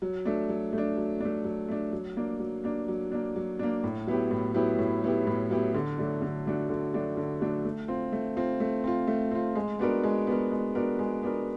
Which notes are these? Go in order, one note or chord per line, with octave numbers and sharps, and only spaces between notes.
F#3
A3 D4
F#3
A3
D4
F#3
A3 D4
F#3
A3 D4
F#3
A#3 D4
F#3
A#3 D4
F#3
A#3 D4
F#3
A#3 D4
A2
F#3 B3 E4 G4
A2
F#3 B3 E4 G4
A2
F#3 B3 E4 G4
A2
F#3 B3 E4 G4
D3
F#3 A3 D4 F#4
D3
F#3 A3 D4 F#4
D3
F#3 A3 D4 F#4
D3
F#3 A3 D4 F#4
A3
C4 F4
A3
C4 F4
A3
C4 F4
A3
C4 F4
G#3
B3 D4 F#4 A#4
G#3
B3 D4 F#4 A#4
G#3
B3 D4 F#4 A#4
G#3
B3 D4 F#4 A#4